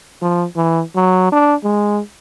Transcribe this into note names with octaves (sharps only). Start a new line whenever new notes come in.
F3
E3
F#3
D4
G#3